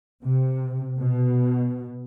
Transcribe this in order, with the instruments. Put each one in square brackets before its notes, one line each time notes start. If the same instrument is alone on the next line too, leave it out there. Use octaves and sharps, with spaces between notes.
[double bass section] C3
B2